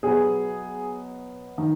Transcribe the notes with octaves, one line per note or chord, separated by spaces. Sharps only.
B2 F#3 B3 G#4
D#3